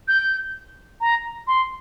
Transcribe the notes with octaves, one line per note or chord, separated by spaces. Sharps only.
G6
A#5
C6